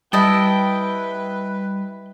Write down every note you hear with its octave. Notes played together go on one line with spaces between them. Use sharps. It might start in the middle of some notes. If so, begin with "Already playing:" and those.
G3 E4 B4 D#5 G5 A5